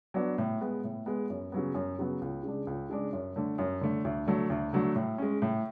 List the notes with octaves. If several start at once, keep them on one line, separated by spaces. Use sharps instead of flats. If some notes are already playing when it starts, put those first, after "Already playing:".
F#3 B3 D4
A2
G#3 B3
A2
G#3 B3
F#2
C#3 F#3 B3
F#2
C#3 F#3 B3
C#2
C#3 G#3 D4
C#2
C#3 G#3 D4
F#2
D3 A3
F#2
D3 A3
D2
D3 F#3 A3
D2
D3 F#3 A3
A2
G#3 C#4
A2